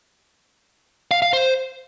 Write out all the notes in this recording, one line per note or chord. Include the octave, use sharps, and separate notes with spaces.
F5
F5
C5